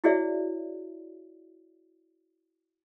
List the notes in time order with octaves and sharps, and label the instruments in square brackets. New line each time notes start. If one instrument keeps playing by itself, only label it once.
[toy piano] E4 F#4 G#4 C#5 D5 E5